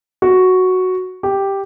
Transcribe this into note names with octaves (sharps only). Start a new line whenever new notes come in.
F#4
G4